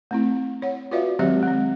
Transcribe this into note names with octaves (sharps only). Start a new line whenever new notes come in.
A3 C4 E4
C#5 F#5
F4 F#4 B4 D5 E5 F5
D#3 F#3 G#3 C4 G4 E5
G#3 C4